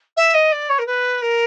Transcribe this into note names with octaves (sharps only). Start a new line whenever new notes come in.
E5
D#5
D5
C#5
A#4
B4
A#4